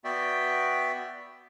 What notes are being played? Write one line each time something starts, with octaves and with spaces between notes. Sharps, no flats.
B3 F#4 D5 E5 G5